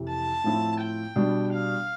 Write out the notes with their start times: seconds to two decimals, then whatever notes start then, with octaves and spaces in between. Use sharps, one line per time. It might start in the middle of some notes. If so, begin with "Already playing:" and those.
Already playing: F2 C3 E3
0.09 A5
0.44 A2 F3 C4 E4
0.80 G5
1.16 B2 G3 D4
1.52 F5